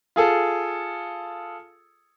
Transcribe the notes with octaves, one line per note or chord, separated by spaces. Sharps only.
F4 G#4 A4